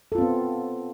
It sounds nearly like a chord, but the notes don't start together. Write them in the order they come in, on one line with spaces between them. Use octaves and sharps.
A4 F4 C4 B3